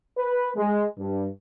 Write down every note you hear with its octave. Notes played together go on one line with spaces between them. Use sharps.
B4
G#3
G2